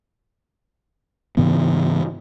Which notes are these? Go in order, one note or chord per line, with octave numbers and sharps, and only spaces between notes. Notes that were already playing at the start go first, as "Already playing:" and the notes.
G#2 C#3 E3 B3